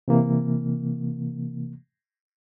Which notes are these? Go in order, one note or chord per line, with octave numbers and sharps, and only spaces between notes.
C3 E3 A#3